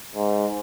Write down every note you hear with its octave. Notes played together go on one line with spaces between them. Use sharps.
G#2